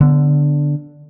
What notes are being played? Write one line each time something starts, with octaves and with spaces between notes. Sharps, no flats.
D3 B3